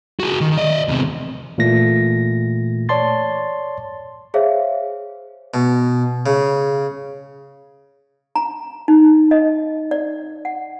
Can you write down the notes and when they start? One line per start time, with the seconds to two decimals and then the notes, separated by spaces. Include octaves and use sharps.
0.20 F#4 G#4
0.41 D#3
0.57 D5 D#5
0.88 E2 C3
1.58 A#2 E3 A3 A#6
2.89 C#5 D5 A5 C6 A6
4.34 G#4 C5 C#5 E5 F5
5.54 B2
6.26 C#3
8.35 A#5
8.88 D#4
9.31 D#5
9.91 D5
10.45 F#5